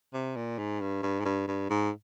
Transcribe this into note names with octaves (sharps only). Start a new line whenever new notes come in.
C3
A#2
G#2
G2
G2
G#2
G2
G2
G#2